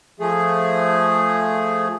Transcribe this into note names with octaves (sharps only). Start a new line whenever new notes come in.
F3 A3 G#4